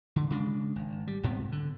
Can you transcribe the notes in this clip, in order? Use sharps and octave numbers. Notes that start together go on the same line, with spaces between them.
D3
C#3 G#3 D4
G#1
G3
C#2 G#2 C3 B3
D3